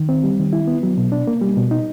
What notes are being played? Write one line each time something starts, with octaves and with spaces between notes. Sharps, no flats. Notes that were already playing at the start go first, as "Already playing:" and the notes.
Already playing: D#3
C4
G3
D#3
E4
B3
F#3
B2
D4
A#3
G3
B2
D#4